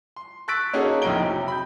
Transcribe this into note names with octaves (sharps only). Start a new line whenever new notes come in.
C6
C#6 E6 F#6 A6 B6 D7
A#3 C#4 D#4 F#4 G#4 A4
A#1 F2 A2 D#4 D7 G7
C3 F#3
B5 G6